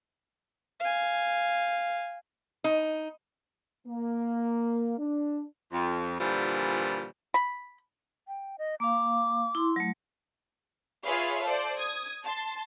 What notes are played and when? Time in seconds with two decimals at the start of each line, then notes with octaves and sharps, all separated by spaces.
0.80 F5 G#5
2.64 D#4
3.87 A#3
4.99 D4
5.72 F2
6.20 A#2 D3 E3 F3 G3
7.34 B5
8.28 G5
8.58 D#5
8.80 A#3 F5 D6
9.55 E4 C6
9.76 F#3 A3
11.05 F4 G#4 B4 C#5 E5 F5
11.43 A4 C5 D5
11.78 D#6 G#6
12.24 A5 C6